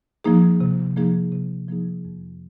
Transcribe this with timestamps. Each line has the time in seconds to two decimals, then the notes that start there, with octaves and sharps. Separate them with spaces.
0.24 F3 A#3 D#4 G#4
0.60 C3
0.96 F3 A#3 D#4 G#4
1.32 C3
1.68 F3 A#3 D#4 G#4
2.05 F2